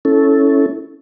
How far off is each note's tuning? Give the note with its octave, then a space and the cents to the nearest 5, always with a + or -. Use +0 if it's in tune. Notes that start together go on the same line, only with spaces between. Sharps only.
C#4 +0 E4 -15 A4 -5